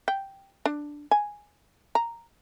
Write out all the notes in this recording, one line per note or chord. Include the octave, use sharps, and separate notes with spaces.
G5
D4
G#5
A#5